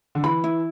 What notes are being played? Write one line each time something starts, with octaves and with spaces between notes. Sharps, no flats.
D3
E3 B5
E4